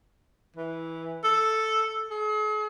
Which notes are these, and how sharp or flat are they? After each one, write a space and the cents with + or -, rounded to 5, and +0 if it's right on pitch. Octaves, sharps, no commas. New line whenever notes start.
E3 -10
A4 +0
G#4 +45